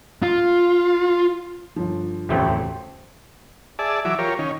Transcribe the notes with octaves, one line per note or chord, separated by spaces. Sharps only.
F4
G1 F3
D1 A1 E2 C3 A3 C4 G4
G#4 D5 E5 A5
E3 F#3 E5 D6
F4 G4 A#4 C#5
D#3 C#4